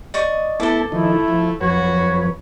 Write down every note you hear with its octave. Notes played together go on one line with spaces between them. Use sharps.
D5 D#5 C#6
A3 B3 E4 A4 A5 D6
D#3 F3 A3 D#4 E4
F3
F2 F#3 F#4 B4 C#5